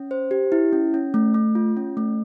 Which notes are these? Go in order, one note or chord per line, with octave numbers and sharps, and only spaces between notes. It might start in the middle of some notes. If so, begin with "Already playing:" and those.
Already playing: C#4
C5
G4
E4
C#4
C#4
A3
A3
F4
C#4
A3